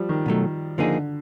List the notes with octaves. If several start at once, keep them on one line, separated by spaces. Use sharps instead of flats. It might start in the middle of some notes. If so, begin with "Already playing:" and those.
Already playing: F3 G3
D#3
B2 F#3 A3
D3 F3 A#3 D#4 G#4